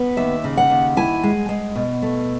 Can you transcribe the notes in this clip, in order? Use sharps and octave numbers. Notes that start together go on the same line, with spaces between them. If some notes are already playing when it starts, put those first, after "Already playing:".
Already playing: B3
D#2 E5
C#3
F#5
D#2
E4 G#5
G#3
G#3
B2
A3